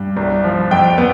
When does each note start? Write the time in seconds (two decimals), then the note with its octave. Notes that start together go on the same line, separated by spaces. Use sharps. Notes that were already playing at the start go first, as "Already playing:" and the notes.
Already playing: G2
0.17 C2
0.44 F3
0.71 F2 G5
0.98 B3